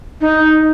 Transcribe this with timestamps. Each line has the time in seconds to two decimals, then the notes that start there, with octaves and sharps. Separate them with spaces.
0.21 D#4